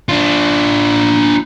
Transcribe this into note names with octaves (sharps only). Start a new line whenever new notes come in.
D4 F4